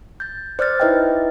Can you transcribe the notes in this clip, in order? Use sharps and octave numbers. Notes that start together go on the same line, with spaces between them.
G6 A6
C5 D5 E6 F6 G6 A6
D#4 E4 B4 D#5 E5 G5